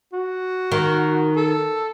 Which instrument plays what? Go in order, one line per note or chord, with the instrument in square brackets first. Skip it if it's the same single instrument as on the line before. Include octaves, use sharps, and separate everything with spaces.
[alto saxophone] F#4
[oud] D#3
[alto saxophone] A4